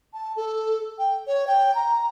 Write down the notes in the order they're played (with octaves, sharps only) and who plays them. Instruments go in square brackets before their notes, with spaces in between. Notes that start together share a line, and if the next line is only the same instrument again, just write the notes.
[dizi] A5
A4
G5
C#5
G5
A#5